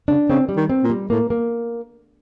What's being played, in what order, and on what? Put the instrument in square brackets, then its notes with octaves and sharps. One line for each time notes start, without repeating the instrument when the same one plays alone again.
[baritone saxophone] C#3 [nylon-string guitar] D4
[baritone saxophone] C#3 [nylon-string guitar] C4
[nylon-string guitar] G3
[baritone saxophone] D#3
[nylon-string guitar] C4
[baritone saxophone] A#2
[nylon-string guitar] G3
[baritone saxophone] A2 [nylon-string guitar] A#3
[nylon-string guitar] A#3